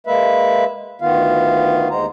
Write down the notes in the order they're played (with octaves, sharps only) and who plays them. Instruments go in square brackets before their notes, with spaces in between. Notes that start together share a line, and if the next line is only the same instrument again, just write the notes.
[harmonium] G#3 A#3 B4 E5
D2 D#3 B3 F4 F5
D#2 G#3 C5 A#5